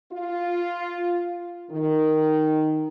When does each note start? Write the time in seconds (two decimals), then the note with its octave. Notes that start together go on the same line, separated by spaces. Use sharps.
0.13 F4
1.71 D#3